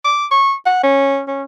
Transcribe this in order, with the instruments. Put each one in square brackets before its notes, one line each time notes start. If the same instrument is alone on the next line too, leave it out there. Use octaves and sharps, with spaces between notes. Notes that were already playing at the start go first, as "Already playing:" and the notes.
[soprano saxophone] D6
C#6
F#5
C#4
C#4